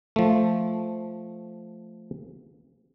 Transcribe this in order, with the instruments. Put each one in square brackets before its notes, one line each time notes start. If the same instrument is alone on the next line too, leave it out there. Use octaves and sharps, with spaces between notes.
[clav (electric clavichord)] F3 A3